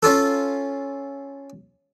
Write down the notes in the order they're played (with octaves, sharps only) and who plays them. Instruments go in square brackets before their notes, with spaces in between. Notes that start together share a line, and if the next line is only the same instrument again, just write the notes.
[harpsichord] C#4 F4 A4